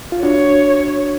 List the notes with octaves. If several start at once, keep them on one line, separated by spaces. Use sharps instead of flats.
F4
D4 F#4 C#5